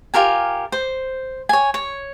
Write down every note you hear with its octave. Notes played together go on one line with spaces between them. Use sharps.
F4 G4 A#4 G#5
C5
C#5 G#5
C#5